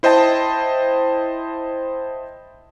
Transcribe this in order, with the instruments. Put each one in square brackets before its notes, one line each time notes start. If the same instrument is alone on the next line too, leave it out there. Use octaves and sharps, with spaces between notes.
[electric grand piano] E4 C5 D#5 G5 A5